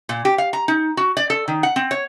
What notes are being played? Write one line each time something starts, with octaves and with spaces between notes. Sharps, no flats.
A#2
G4
F5
A#5
D#4
F#4
D5
A4
D#3
F#5
C4
C#5